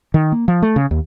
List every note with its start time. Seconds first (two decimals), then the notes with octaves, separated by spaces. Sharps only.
0.14 D#3
0.32 A#3
0.48 F3
0.62 A3
0.76 C#3
0.91 D#2